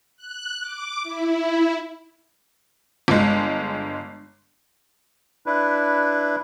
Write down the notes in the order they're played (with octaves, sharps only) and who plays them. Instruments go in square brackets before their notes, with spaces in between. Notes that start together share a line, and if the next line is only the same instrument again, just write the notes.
[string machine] F#6
D6
E4
[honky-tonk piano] G1 G#3
[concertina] D4 E4 B4